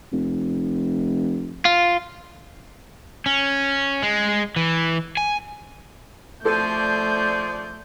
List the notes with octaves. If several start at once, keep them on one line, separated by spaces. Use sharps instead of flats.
F1
F4
C#4
G#3
E3
G#5
F3 A3 G#4 A4 D5 G6